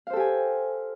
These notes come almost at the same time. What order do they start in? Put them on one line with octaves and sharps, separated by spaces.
F5 C5 A4 G4 G#5